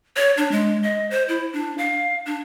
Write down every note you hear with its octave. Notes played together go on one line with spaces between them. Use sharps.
C#5
D4
G#3
D#5
C5
E4
D4
F5
D4